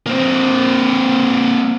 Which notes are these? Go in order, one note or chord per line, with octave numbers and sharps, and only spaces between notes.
A#3 C4